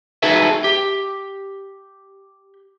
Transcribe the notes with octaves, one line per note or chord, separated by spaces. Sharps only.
D#4 F#4 G#4 A4 B4 E5
G4